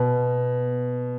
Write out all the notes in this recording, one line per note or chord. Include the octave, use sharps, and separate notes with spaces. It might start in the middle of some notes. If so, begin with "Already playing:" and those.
Already playing: B2